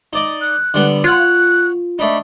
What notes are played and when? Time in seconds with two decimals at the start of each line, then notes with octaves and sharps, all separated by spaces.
0.13 D#4 D5 D#5
0.41 F#6
0.74 D3 G3 B3
1.04 F4 C#5 F#5 F#6
1.99 A3 D4 D#4 B5